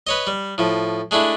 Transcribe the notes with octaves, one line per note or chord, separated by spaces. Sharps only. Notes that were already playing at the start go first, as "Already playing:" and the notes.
B4 C#5 D#5
G3
A2 F3
G#3 A3 D4 E4